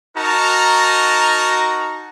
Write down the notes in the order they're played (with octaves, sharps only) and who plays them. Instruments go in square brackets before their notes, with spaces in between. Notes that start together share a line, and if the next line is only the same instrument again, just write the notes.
[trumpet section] D#4 F#4 A#4 A5 A#5